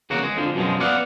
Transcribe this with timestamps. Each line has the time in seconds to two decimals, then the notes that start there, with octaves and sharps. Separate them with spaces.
0.10 E2 C#3 A#3 F#4
0.23 G#3
0.37 F2 D3 F3
0.55 F#2 B2 D#3 F3 G#3
0.80 B3 D5 F5 F#5